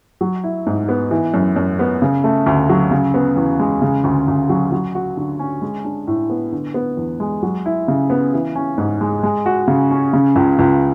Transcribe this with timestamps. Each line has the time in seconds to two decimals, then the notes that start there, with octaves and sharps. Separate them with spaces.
0.21 F#3
0.44 E4
0.66 G#2
0.89 B3
1.11 E3
1.34 F#2
1.56 F#2
1.79 B3
2.02 C#3
2.24 A3
2.46 D2
2.69 F#3
2.91 C#3
3.14 B3
3.36 E2
3.59 G#3
3.82 C#3
4.04 D2
4.28 D2
4.49 F#3
4.72 F#3
4.95 F#4
5.17 D3
5.39 C#4
5.62 G#3
5.85 D4
6.07 A2
6.30 B3
6.52 D3
6.74 B3
6.97 E2
7.20 G#3
7.43 F#3
7.66 E4
7.88 C#3
8.10 B3
8.33 E3
8.55 C#4
8.78 G#2
9.01 G#3
9.23 G#3
9.46 F#4
9.68 C#3
9.91 C#4
10.13 C#3
10.36 C#2
10.59 C#2